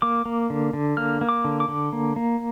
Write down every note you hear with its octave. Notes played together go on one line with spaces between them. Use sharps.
A#3 D6
A#3
D3
D3
A#3 F6
A#3
D6
D3
D6
D3
A#3
A#3